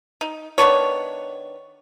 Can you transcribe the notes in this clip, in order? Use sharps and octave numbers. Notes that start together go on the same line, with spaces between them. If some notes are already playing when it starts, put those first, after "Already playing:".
D#4
D#3 B3 D4 C#5